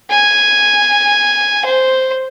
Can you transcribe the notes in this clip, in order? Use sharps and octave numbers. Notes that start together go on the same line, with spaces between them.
G#5
C5